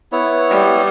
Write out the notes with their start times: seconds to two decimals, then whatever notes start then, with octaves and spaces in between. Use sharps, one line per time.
0.12 B3 E4 C#5
0.50 G3